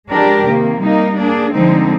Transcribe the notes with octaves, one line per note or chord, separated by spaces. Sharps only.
F3 G#3 D4 G4 A#4
C3 D#3 A#3
G3 A#3 D#4
A#3 D4 G#4
D3 F3 G#3 C4 D#4